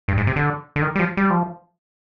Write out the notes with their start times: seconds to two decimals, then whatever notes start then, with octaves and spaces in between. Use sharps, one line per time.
0.08 G2
0.17 G#2
0.27 C3
0.36 D3
0.76 D3
0.82 D#3
0.96 G3
0.99 F3
1.17 G3
1.30 F3